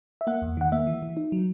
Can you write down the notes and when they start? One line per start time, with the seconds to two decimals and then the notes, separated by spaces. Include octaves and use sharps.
0.21 E5
0.27 A#3 F#5
0.42 E2
0.57 D#3 F#5
0.72 A#3 E5
0.87 E3
1.02 E3
1.17 D#4
1.32 F#3